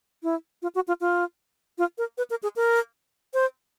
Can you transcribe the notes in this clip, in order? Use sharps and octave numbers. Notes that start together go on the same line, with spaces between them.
E4
F4
F#4
F4
F4
F4
A#4
B4
A#4
G#4
A#4
C5